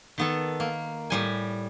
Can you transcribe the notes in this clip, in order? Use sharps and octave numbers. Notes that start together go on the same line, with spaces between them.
D#3 B3 A4
A#3
A2 G3 G#5